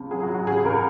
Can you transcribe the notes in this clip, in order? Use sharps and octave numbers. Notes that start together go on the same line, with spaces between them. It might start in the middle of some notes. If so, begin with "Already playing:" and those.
Already playing: C#2 C3 F3
F#3 G#4
F#4
F#3
F#4
C#2 G#4
C#2 A#4